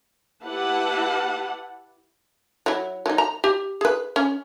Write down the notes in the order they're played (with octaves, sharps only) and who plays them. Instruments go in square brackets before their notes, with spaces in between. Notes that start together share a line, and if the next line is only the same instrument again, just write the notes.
[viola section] E4 G4 B4 F#5 A5
[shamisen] F#3 E4
F#3 D#4
A#5
G4
G#4 B4
C#4